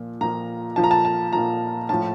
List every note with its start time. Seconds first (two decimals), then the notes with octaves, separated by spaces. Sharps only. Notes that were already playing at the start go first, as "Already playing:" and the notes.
Already playing: A#2 F3
0.21 A#2 F3 A#5
0.76 A#2 F3 A5
0.84 A#5
0.91 A5
1.05 A5
1.33 A#2 F3 A#5
1.89 A2 F3 A5